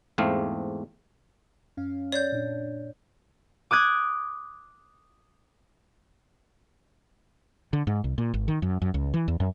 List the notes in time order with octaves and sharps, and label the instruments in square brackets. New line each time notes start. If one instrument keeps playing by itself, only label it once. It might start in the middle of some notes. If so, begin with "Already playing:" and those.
[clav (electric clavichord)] E2 G#2 A3 C4 F5
[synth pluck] F#2 C#4 F5
[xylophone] C#5 D5 G6
[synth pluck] A#2 D4
[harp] D6 D#6 F#6 G#6
[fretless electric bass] D3
G#2
C2
A#2
G#1
D#3
F#2
F#2
C#2
E3
E2
F#2